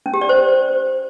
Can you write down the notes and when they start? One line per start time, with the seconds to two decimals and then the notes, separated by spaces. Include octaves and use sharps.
0.06 C#4
0.14 G4
0.21 D5
0.29 C5